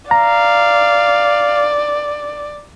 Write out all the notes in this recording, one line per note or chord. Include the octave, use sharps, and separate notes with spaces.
D5 F5 A#5